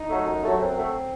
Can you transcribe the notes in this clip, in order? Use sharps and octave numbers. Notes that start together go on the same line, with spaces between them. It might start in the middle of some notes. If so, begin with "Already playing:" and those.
Already playing: D#4
F#3 A3
F#2
F#3 A3
F#2 C4
F#3 A3